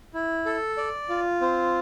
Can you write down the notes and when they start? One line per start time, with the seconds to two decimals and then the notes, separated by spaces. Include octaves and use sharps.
0.14 E4
0.46 A4
0.77 D5
1.09 F4
1.41 C4